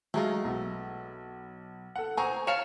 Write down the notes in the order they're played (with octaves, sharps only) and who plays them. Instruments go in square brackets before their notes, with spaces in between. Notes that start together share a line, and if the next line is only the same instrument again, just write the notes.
[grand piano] F#3 G#3 [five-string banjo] A3 D#4 F4
[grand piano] B1
A4 F#5
[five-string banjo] C4 G#4 C5 [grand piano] G#5 A#5 C#6
[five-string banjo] C#5 F5 A5 [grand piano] C#7 E7 F7